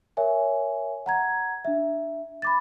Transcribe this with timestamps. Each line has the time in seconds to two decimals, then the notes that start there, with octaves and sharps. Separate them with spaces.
0.17 A#4 C#5 E5 G#5
1.06 F#5 A#5 G#6
1.65 D4 E5
2.42 B5 D6 A6